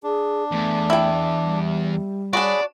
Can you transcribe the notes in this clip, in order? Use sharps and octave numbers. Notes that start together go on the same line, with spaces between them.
D4 G#4
E2 A3
E4 G5
G3
D4 F#4 G#4 C#5 D5 B5